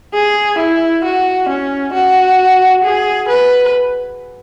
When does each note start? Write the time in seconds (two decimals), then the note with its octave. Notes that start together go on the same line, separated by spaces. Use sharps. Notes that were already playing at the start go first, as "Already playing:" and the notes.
0.14 G#4
0.59 E4
1.04 F#4
1.49 C#4
1.94 F#4
2.84 G#4
3.28 B4